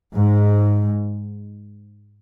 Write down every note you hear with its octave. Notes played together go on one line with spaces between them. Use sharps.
G#2